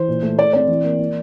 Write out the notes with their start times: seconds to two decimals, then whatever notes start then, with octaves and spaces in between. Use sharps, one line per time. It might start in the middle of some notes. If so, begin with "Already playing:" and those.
Already playing: E3 C5
0.08 A#2
0.23 A3
0.38 A3 D5
0.53 C4 D5
0.68 E3
0.84 A#3
0.99 A#3